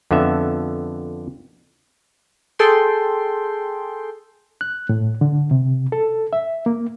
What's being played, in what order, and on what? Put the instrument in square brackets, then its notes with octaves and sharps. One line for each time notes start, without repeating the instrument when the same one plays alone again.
[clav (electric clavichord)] F2 D3 B3 E5
[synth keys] G#4 A4 G5 C6
[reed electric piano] F#6
A2
D3
C3
A4
E5
A#3